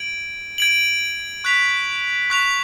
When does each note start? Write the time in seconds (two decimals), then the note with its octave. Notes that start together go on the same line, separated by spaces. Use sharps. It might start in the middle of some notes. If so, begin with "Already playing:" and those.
Already playing: G#6 D7 F#7
0.58 G#6 D7 F#7
1.44 C#6 F#6 B6 F7
2.30 C#6 F#6 B6 F7